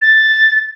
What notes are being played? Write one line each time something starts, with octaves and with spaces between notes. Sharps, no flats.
A6